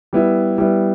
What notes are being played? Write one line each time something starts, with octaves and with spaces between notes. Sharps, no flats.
G3 B3 E4
G3 B3 E4